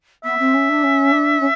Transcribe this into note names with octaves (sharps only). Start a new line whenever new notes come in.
B3 E5
C4
C#4
D4
C#4
D4
C#4